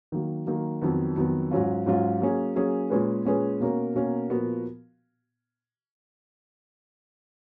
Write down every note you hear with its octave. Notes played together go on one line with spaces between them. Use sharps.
D#3 F#3 A#3
D#3 F#3 A#3
F2 D#3 F#3 B3
F2 D#3 F#3 B3
G#2 F#3 C#4 F4
G#2 F#3 C#4 F4
F#3 A#3 C#4 G#4
F#3 A#3 C#4 G#4
A#2 G#3 C#4 G#4 B4
A#2 G#3 C#4 G#4 B4
B2 A#3 C#4 F#4 A#4
B2 A#3 C#4 F#4 A#4
A#2 F3 B3 F#4 A#4